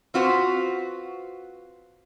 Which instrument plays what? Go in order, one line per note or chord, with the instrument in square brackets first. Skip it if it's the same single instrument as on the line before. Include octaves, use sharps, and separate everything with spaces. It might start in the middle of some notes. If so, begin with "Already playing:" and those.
[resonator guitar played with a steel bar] C4 F4 F#4 B4 C5